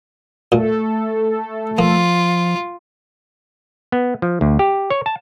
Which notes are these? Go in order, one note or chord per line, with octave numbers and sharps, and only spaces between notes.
A#2 A3 A4
F3 A#3 F4
B3
F3
D2
G4
C#5
A5